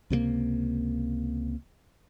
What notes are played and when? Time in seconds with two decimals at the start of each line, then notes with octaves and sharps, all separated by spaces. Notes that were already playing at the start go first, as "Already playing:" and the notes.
0.10 C#2 C3 F3 A#3